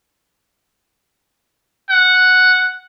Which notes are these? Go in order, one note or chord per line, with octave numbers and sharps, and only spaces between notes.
F#5